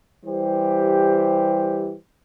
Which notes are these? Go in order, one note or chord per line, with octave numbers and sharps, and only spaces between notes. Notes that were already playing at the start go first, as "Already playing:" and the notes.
E3 G3 G4 C5